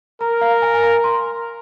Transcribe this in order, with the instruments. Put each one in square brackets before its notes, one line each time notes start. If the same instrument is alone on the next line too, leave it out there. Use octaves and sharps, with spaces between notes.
[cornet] A#4 [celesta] A#5
[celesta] F5
G#5
A#5
C6